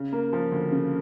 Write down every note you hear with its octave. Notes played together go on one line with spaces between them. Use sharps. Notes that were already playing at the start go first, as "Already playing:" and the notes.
Already playing: C#3
A#3
F3
D2
C#3